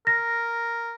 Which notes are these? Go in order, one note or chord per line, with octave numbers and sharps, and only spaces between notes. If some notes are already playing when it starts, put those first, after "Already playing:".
A#4 A#6